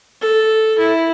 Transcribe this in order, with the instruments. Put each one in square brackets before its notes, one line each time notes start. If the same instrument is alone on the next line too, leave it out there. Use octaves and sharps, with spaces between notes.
[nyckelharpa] A4
E4